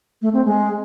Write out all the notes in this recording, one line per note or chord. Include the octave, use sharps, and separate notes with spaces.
A3
C4
G#3